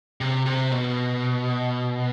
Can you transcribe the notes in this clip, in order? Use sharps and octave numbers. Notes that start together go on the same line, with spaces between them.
C3
C3
B2